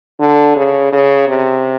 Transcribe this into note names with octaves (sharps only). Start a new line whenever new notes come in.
D3
C#3
C#3
C3